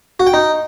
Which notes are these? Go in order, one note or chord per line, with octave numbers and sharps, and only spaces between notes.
F#4
G5
D#4